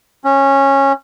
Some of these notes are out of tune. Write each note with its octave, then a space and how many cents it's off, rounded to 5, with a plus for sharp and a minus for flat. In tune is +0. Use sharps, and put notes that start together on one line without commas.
C#4 -15